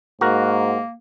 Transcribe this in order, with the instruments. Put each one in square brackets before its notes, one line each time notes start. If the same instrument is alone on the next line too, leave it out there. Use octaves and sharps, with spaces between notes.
[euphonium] G#2 [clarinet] A#3 [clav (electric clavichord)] F#4 A#4